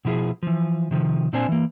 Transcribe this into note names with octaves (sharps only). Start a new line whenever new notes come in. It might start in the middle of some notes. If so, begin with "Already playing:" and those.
B2 F3 E4 G#4
E3 F3
C3 D#3 F3
A#2 C4 D4 C5 G#5
E3 A#3